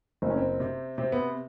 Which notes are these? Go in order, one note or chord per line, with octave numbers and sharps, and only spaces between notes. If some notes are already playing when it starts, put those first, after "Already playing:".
F#1 C4
C#4
C4
C3
C3 C4
B3